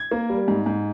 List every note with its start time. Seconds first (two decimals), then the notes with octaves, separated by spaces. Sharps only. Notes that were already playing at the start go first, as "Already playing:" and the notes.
Already playing: G#6
0.11 A#3
0.30 G3
0.48 G#2
0.66 G#2